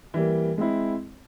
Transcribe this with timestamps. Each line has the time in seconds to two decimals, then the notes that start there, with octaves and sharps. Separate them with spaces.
0.14 E3 G3 A#3
0.58 G#3 C4 E4